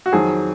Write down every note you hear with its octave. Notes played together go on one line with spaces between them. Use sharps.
F#4
F2 D#3 F#3 G#4